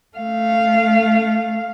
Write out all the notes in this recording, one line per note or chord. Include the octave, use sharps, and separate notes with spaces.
A3 F5